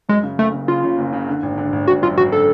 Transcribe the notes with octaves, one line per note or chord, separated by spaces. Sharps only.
F#2 G#3
C#3
F#1 A3
C#3
C#3 F4
C#3
F#1
C#3
D3
G#1
D3
G#1
G#1 F#4
F#2 F4
G#1 F#4
D3 A4